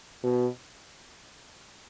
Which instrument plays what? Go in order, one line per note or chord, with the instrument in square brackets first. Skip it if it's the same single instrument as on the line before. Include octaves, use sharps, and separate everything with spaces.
[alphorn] B2